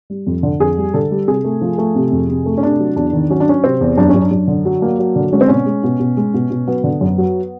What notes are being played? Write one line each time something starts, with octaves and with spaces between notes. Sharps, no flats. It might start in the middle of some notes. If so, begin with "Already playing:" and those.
G3
F2
D3
F2 G#4
G3
D3 A4
G3
C3 G#4
A3
F3
A3
C3
F2
C3
A3
C#4
C3 D4
F#3
E2 D4
D#3
F#3 C#4
D4
F#3 C#4
C3 C4
E2
F#2 D4
C#4
F#2
D4
F#2
D3
F#3
A#3
F#3
D3
G#3 C#4
C4
B2 C#4
G#3
B2
B2
G#3
B2
B2
F#3 B3
D3
F#2
F#3